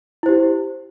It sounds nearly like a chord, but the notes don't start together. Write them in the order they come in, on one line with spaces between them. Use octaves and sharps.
E4 C5 G4